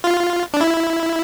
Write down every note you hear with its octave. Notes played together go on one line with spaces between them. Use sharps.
F4
D4
E4